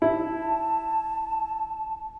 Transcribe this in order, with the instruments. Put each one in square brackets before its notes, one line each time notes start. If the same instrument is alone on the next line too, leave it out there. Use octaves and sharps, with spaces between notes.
[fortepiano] E4 [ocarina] A5